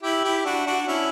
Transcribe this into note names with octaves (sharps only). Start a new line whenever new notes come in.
E4 G4
E4 G4
D4 F#4
D4 F#4
F#4
C#4 E4